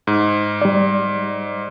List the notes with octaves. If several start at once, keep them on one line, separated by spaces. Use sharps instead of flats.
G#2
G3 D5